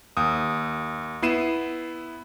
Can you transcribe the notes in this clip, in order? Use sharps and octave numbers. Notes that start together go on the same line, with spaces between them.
D#2 D#6
B3 E4 C7 D#7 E7